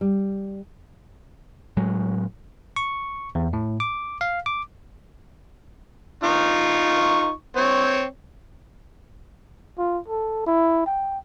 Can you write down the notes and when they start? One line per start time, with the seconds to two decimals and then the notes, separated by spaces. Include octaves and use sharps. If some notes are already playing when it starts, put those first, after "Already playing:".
0.01 G3
1.77 A2 F#3 G#3
2.76 C#6
3.35 E2
3.53 A2
3.80 D6
4.21 F5
4.46 D6
6.24 D#4 F4 C#6
7.56 C4 C#5
9.78 F4
10.08 A4
10.46 E4
10.86 G5